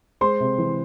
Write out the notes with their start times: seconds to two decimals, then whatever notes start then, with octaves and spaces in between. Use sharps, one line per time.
0.21 G#3 C5 C6
0.40 C3
0.58 E3